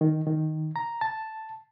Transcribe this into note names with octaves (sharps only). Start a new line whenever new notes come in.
D#3
D#3
A#5
A5